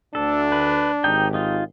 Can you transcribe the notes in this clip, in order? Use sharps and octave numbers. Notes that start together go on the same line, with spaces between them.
D2 D4 A4
B4
G#1 D#4 G4 G5
D#4 F4